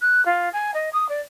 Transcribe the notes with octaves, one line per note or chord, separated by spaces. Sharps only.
F#6
F4
G#5
D#5
D#6
D5